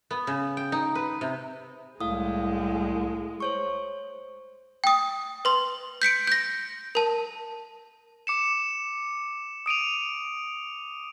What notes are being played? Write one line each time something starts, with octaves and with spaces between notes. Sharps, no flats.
B3
C#3
G5
D#4
B4
C3
C2 A2 G#3 F5 D#6
C5 C#5 C#6
G5 D#6
B4 C6
G6 B6 C#7 D7
G6 A#6
A#4 A5
D6 C#7 E7
D#6 D7 D#7 F7